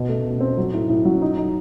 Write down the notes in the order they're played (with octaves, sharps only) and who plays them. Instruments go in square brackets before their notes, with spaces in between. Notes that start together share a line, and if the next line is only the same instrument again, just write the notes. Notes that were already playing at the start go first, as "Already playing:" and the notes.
Already playing: [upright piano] B2
A3
B2
C4
F#3
A2
A2
F#3
D#4
D#4